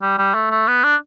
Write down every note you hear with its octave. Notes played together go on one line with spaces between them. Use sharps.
G3
G3
A3
A3
B3
D4